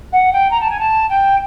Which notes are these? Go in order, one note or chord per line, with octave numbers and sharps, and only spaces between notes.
F#5
G5
A#5
A5
G#5
A5
G5